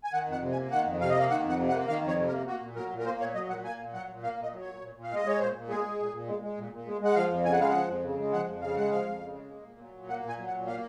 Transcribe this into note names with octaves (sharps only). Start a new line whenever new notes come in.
G#5
D#3 F#5
F2
F#5
C3
G#5
A#3
D#3 F#5
F2
C3 F5
D#5
A#3 F5
D#3 F#5
F2 F#5
C3
F#5
A#3
D#3 F5
F2
C#5
C3
A#4
A#3
A#3 F#4
A#2
F#3 A#4
A#2
A#4
A#3 C5
A#2 C#5
F#3 D#5
A#2 F#5
A#3 G#5
A#2
F#3 F#5
A#2
A#3 F5
A#2 D#5
F#3
C#5
A#2
A#2
A#2
F5
G#3 D#5
G#3 C#5
A#2 C5
A#2
G#3 G#4
G#3
A#2
A#2
G#3
G#3
A#2
A#2
G#3
G#3 F#5
F3 F5
F2
C#3 G#5
F#5
G#3 F5
F#5
F3
F2
C#3
G#3
F3 F#5
F2
C#3 F5
G#3 F#5
F3 F5
F2
C#3
G#3
A#3
A#2
F#3
A#2
A#3 F#5
A#2
G#5
F#3
F#5
A#2
A#3 F5